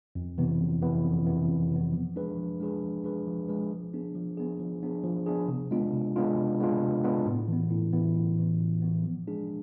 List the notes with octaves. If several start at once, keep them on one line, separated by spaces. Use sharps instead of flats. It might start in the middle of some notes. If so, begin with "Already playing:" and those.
F2
C3 E3 B3
F2
C3 E3 B3
F2
C3 E3 B3
F2
C3 E3 B3
F3
G#3 D4 G#4 B4
F3
G#3 D4 G#4 B4
F3
G#3 D4 G#4 B4
F3
G#3 D4 G#4 B4
F3
B3 D4 G#4
F3
B3 D4 G#4
F3
B3 D4 G#4
F3
B3 D4 G#4
C3
G#3 B3 D4 F4
C3
G#3 B3 D4 F4
C3
G#3 B3 D4 F4
C3
G#3 B3 D4 F4
A2
E3 B3
A2
E3 B3
A2
E3 B3
A2
E3 B3
F3
G#3 D4 G#4